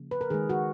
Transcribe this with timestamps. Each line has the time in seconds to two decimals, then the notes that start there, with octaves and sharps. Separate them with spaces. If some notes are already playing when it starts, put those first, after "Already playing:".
Already playing: C#3 F3 A#3
0.11 B4
0.21 A#4
0.30 D#3 G#3 G#4
0.50 F#4